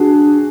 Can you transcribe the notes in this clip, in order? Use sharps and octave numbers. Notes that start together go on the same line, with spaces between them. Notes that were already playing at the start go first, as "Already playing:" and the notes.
Already playing: D4 F#4 G#4